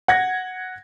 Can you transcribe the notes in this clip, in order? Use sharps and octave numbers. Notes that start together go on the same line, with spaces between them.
F#5 G#6 A#6